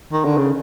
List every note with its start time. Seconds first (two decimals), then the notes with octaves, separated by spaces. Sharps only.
0.12 D#3
0.25 D3
0.38 C#3